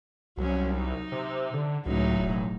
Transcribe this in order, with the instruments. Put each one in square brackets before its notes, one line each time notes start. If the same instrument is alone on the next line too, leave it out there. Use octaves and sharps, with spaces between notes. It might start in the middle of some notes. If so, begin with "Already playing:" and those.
[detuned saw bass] C2 [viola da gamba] F#3 C#4
[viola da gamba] D#4
[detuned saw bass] C3
D3
[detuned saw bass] C#2 [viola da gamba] A2 F#3 D#4
[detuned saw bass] E1